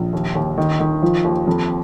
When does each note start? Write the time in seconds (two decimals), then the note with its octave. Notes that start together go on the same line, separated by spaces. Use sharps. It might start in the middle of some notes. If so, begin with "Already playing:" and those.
Already playing: A#1
0.13 D#2
0.35 D#2
0.58 D#3
0.80 D#3
1.02 F3
1.24 D#2
1.47 F2